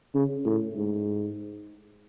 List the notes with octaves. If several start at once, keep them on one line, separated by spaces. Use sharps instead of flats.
C#3
A2
G#2